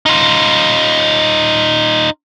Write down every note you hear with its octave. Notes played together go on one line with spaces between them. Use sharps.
D#4 F4